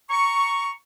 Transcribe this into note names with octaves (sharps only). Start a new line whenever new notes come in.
A#5 C#6